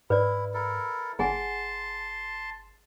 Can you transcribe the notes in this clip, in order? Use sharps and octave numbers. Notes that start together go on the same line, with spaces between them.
G#2 E4 B4 D5
E4 A4 A#4
G1 G#4 F#5 G#5 A5 C6